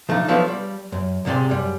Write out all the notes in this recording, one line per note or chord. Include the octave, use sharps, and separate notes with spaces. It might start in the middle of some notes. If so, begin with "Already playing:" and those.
F3 A3 D4 D#4
F3 F#3 A3 B3 D4
G3
F#2
C2 G#2 C3 D5 C6
F#2 G3